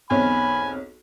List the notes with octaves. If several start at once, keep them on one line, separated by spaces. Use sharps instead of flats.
B1 E2 C4 C#5 G#5 B5 F6